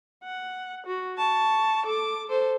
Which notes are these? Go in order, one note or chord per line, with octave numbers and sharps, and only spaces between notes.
F#5
F#4
A5 C#6
A4 D6
A4 C5